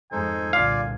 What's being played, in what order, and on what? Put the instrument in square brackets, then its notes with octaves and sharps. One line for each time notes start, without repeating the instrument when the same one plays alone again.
[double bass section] F2 G#2 G#3 [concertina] D#4 A4 C5 [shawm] G#5
[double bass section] C2 A#2 D3 [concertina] F4 D5 [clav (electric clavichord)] F5